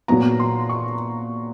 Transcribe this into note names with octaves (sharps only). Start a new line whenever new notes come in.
A#2 F#3 B3 A#5
C6
C#6